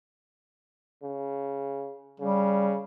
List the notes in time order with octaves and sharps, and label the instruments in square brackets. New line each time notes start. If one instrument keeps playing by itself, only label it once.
[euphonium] C#3
[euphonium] C#3 [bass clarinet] G3